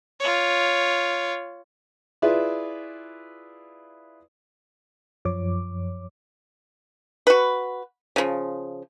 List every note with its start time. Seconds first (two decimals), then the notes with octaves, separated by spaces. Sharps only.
0.20 F4 C#5
2.22 E4 F4 G#4 B4 D5 E5
5.25 F#2 F3 C#5 D6
7.27 F#4 B4
8.16 C#3 F3